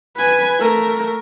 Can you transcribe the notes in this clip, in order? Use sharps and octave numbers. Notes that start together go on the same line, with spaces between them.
B4 G#5
A3 A#4